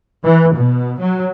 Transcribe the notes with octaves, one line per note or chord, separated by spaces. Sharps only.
E3
B2
F#3